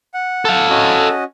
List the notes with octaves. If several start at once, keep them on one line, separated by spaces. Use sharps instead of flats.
F#5
A4 F5
C#4 F#4 D#5